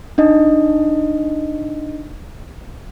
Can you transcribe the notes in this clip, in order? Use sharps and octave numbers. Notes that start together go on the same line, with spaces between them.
D4 D#4 D#5